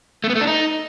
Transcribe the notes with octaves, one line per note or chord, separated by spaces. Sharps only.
A3
B3
A3
D4
D#4